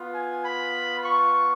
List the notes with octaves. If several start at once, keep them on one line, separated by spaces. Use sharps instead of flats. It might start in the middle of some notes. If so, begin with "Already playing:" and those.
Already playing: B3 F4
G#5
B5
C#6